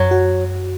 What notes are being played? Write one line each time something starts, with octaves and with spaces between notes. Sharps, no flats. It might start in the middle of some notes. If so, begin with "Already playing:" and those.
Already playing: F#2 F#3
F#4